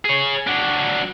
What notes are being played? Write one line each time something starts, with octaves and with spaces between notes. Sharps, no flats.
G#4 C#5
F#3 D4